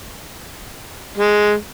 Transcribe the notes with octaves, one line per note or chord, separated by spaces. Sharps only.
G#3